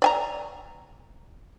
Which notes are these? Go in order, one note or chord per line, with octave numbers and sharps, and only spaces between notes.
D5 G#5 A#5